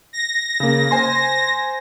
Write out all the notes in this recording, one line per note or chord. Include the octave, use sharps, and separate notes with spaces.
A#6
C#3 A#3
C5 G#5 C6